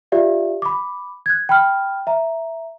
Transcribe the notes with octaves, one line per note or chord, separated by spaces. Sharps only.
F4 G4 D5 E5 F5
B5 D6
F#6 G#6
G5 B5 F6
E5 A#5